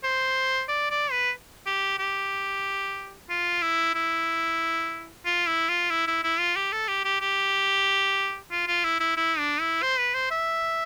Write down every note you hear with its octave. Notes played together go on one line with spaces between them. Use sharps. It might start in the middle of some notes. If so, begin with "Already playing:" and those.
C5
D5
D5
B4
G4
G4
F4
E4
E4
F4
E4
F4
E4
E4
E4
F4
G4
A4
G4
G4
G4
F4
F4
E4
E4
E4
D4
E4
C5
B4
C5
E5